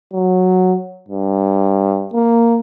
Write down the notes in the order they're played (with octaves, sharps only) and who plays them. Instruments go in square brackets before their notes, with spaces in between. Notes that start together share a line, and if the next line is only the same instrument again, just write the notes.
[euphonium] F#3
G2
A#3